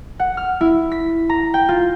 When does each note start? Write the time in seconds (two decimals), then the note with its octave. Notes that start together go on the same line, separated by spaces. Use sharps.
0.20 F#5
0.37 F6
0.61 E4
0.92 B6
1.29 A#5
1.54 G5
1.69 F4